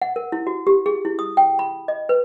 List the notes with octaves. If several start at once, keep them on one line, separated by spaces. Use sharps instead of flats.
F#5
A#4
E4
F#4
G4
G#4
E4
D#6
G5
B5
D#5
B4